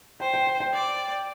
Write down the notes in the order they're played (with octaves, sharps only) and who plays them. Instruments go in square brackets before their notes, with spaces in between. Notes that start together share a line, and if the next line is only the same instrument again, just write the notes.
[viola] C5 [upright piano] G5
[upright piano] G5
G5
G5
[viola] D5